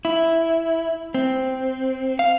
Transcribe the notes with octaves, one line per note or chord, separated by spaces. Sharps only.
E4
C4
F5